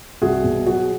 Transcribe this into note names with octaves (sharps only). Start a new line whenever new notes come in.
C2 F#4 G#4
B2
F#3 F#4 G#4